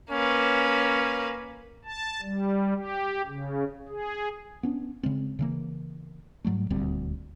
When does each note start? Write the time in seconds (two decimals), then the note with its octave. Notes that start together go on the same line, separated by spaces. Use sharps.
0.11 A#3 C#4 B4
1.85 A5
2.21 G3
2.74 G4
3.26 C#3
3.88 G#4
4.63 B3 C#4 D4
5.03 C#3 G#3 C4
5.39 C#3 E3 A#3
6.45 G#2 F#3 G3 A3
6.70 D#1 D2 G3 C4